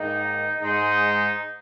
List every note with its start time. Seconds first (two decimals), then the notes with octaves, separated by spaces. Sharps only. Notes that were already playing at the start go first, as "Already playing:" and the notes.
Already playing: G#2 D#3 A#3 D#4
0.60 G#2 G#3 D#4